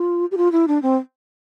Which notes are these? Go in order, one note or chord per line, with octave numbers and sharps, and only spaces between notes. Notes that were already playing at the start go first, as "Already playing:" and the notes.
Already playing: F4
G4
F4
E4
D4
C4